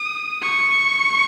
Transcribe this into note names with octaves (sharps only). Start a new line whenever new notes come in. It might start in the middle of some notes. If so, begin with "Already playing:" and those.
Already playing: D#6
C#6